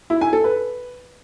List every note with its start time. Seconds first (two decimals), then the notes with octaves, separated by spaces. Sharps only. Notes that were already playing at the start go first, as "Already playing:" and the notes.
0.10 E4
0.21 G#5
0.33 A4
0.44 B4